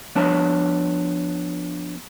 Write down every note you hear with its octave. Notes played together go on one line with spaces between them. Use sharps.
F3 B3 D4 B4 C#5 A5